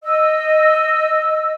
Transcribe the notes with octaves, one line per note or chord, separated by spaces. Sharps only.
D#5 E6